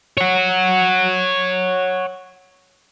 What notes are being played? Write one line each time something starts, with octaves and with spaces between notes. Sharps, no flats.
C#5 F#5